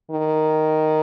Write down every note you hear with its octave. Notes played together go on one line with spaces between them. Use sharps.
D#3